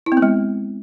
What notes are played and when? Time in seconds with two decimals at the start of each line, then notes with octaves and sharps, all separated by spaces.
0.06 E4
0.12 C4
0.17 B3
0.22 G#3